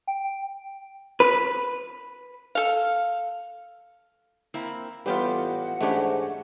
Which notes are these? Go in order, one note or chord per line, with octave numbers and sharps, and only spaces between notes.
G5
B4
A4 F5
A#3 C4 E4
A2 E3 G3 B3 F4 G4 B4 F#5
G#2 E3 A3 C#4 D4 G4